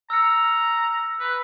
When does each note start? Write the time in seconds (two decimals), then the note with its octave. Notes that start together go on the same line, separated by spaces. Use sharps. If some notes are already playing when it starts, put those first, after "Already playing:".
0.10 A#5 E6 F6 C#7
1.20 B4